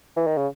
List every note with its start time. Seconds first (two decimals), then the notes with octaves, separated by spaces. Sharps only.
0.16 E3
0.27 D#3
0.37 C#3